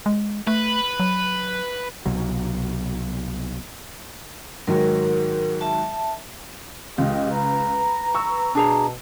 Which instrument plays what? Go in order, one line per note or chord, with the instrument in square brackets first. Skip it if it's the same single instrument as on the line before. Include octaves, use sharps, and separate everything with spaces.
[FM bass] G#3
[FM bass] A3 [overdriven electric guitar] B4
[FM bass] F#3
[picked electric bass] C2 B2 F#3
[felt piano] G#2 D#3 F#3 [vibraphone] A#4
[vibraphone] E5 A5
[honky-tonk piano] C#2 [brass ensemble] G4 D#5
[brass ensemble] B4 A#5
[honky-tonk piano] C#6 E6
[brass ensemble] B2 [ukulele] D4 G#4 A#5